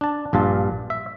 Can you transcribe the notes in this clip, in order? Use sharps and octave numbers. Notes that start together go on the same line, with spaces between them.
D4 A5
A#1 G2 F4 A5
E5